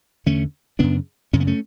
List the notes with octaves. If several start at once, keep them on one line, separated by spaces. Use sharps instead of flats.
E2 D3 A3 C#4
F#2 C#3 B3 D4
F#2 C#3 C#4
B3
A3 C#4